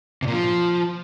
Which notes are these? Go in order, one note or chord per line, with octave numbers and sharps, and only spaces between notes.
C3
A#2
F3